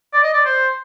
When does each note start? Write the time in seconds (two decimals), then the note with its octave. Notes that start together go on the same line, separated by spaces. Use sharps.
0.13 D5
0.23 D#5
0.34 D5
0.45 C5